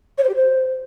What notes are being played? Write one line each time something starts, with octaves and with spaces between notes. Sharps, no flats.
C#5
C5
G4
C5